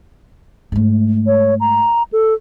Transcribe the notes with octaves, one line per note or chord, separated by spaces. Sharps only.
G#2 A3
C#5
A#5
A4